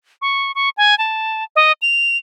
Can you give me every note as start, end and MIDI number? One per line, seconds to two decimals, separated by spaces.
0.22 0.52 85
0.55 0.69 85
0.77 0.97 80
0.98 1.44 81
1.56 1.72 75
1.82 2.17 101